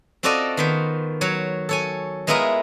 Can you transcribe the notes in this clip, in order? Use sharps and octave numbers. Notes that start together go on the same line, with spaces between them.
C4 F4 F#4 A4 D5 D#5
D#3 B3 C5
F#3 C#5
A4 C#5 G#5
G#3 B3 E4 F4 A#4 D#5